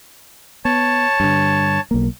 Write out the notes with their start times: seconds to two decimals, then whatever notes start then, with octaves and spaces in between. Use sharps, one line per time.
0.65 B3 C#5 A5
1.20 G2 D3
1.91 B1 A#3